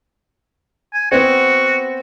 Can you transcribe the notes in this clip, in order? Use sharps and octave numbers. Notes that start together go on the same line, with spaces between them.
G#5
B3 C4 F#4